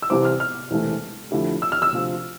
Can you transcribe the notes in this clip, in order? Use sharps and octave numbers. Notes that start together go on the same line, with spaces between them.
E6
C2 C3 E3 G3 C4 D6
F6
F6
E1 E2 C3 E3 A3
F2 D3 A3 E4 G4
E6
F6
E6
D2 C3 F3